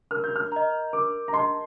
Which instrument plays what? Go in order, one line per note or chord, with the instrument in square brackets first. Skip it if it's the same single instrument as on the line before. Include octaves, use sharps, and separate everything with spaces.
[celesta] A#4 [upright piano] F6
[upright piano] G6
F6
[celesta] D#5 A#5
[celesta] A#4 [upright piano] D6
[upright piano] A#5
[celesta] D#5 A5 [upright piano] C6